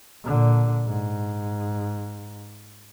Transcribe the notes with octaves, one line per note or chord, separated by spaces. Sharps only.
A#2 D3
G#2